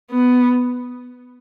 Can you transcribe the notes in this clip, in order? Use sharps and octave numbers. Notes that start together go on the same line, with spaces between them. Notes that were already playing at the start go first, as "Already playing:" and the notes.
B3